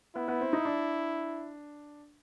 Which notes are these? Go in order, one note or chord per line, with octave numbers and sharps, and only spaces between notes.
B3 E4
B3
C4
D#4
D4